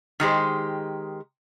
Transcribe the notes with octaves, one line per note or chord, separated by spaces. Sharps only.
D#3 G#3 G4 C5